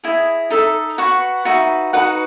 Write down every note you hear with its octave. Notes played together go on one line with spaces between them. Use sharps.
E4 G#4 D#5 G#5
D#4 A4 E5
F#4 B4 F#5 C#6
D#4 F#4 B4 E5
D#4 F#4 B4 F#5